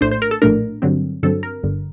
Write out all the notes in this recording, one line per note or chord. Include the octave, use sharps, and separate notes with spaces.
A#1 A2 A3 D4 C5
C5
A#4
A4
A#1 A2 A3 D4 A#4
G2 D3 F#3 C4
G2 D3 F#3 C4 A4
A#4
G1 G2 D3